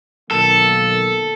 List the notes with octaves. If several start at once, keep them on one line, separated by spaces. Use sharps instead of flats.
B1 D#3 A#3 A4